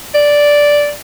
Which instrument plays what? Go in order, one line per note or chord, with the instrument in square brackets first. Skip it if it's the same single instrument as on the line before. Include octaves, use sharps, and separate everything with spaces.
[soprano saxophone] D5